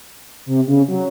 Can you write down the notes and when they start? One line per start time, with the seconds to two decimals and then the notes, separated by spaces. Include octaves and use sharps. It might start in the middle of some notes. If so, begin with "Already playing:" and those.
0.46 C3
0.67 C#3
0.88 F#3